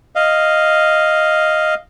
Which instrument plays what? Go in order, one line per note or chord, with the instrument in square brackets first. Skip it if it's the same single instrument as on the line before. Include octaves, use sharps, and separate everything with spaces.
[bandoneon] D#5 F5